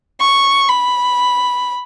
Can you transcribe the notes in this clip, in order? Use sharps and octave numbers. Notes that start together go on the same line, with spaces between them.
C#6
B5